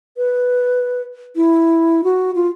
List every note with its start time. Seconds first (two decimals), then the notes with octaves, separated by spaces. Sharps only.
0.17 B4
1.36 E4
2.04 F#4
2.35 F4